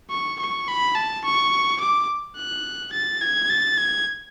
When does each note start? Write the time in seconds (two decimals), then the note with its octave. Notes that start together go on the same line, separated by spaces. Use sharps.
0.10 C#6
0.40 C#6
0.68 B5
0.95 A5
1.24 C#6
1.80 D6
2.36 F#6
2.93 A6
3.21 G#6
3.49 A6
3.78 G#6